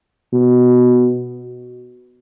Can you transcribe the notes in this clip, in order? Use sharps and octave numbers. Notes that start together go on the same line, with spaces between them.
B2